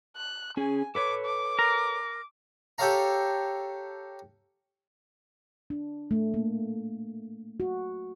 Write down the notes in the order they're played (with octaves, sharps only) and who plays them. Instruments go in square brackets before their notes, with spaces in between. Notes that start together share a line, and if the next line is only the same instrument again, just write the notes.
[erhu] F#6
[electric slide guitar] C#4 G#4 [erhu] G#5
[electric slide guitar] A4 B4 C#5 [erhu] D6
[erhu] D6
[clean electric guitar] A#4
[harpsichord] G4 A4 C#5 F5 A#5
[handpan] D4
A3
A#3
F#4